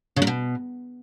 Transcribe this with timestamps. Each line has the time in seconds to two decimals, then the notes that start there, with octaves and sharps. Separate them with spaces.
0.16 C#3
0.22 A#2
0.27 B2